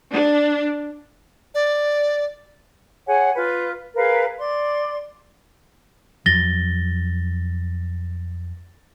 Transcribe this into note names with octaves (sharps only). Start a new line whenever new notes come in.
D4
D5
G#4 C#5 F#5 G#5
F4 B4
G#4 A#4 B4 F5
D5 C6
F2 F#3 A6 A#6 G7